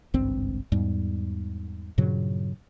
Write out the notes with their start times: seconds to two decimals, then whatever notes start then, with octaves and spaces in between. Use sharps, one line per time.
0.14 G#1 C#2 G2 C4
0.72 E2 G#2 G3
1.98 G2 A#2 C#3 F#3